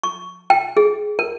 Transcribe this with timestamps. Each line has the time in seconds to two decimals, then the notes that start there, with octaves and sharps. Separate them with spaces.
0.03 C#6
0.50 G5
0.77 G#4
1.19 A#4